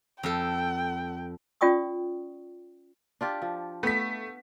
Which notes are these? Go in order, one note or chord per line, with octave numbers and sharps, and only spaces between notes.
F2 A4 G5
C#4 F4 D5 G5 C#6 D#6
D4 F4 G4
F3
A3 B3 B6